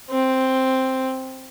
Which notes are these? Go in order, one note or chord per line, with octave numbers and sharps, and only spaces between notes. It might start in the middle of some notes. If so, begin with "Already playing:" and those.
C4